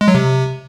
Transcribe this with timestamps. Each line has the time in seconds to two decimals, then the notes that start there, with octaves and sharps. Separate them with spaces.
0.01 G#3
0.08 F#3
0.15 C3